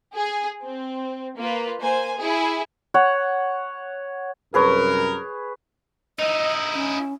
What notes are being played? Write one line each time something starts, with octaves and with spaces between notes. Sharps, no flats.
G#4
C4
A#3 F4 B4
A#3 C5 G#5
E4 G#4
C#5 F#5
C2 F#2 G#4 A#4 B4 C#5
D#4 E4 D#5
C#4